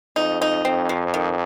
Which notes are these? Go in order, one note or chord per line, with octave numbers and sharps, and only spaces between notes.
F2 D#4
D#4
F2 C4
F3
D#3